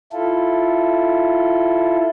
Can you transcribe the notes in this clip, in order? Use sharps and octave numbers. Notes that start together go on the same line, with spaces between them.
E4 F4 A4